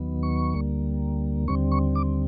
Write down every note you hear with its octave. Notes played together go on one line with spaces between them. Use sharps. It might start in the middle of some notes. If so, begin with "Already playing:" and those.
Already playing: D#2 D#3 F#3 B3
C#6
D2 D3 G3 A#3
D#2 D3 G3 C4 C#6
C#6
D6